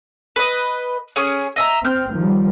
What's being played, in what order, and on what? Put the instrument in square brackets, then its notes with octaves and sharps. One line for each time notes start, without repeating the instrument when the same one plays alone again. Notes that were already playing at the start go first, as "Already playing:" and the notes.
[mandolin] B4 D#5
C#4 G#4 D#6
D#5 E5 A#5
[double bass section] C4 [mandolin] F6 G6
[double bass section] D#3 F3 G3